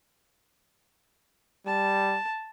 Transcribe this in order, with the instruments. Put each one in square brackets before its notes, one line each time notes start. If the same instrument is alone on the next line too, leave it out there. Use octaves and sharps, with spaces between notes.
[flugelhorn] G3 [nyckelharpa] A5